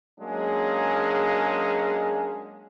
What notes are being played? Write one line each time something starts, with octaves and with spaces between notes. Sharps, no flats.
F#3 G#3 A#3 C#4 D4 G#4